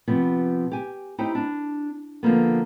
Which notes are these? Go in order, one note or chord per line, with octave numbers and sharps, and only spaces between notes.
C3 F3 B3
G4 G#5
D#4 E4 G4 C5 G5
D4
D3 F3 A#3 B3